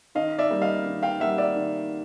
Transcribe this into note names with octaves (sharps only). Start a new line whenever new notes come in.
D#3 D#5 F5
D5 E5
G3 A#3
D#5 F5
D#3
F5 G5
G3 A#3 E5 F#5
D5 E5
D#3